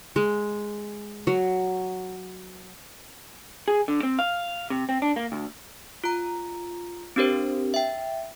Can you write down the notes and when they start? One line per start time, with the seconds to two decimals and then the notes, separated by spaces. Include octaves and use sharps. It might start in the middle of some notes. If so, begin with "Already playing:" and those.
0.16 G#3
1.27 F#3
3.68 G#4
3.88 D3
4.03 C4
4.19 F5
4.70 C3
4.89 C4
5.02 D4
5.16 A#3
5.32 D2
6.04 F4 A#5
7.16 C4 D4 G4 A#4 C5
7.74 E5 G5